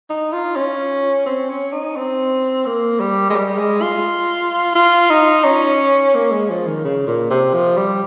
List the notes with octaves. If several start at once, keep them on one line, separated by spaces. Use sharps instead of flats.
D#4
F4
C#4
C4
C#4
D#4
C4
A#3
G3
G#3
G3
G#3
F4
F4
D#4
C#4
A#3
G#3
F3
D#3
C#3
A#2
C3
F3
G3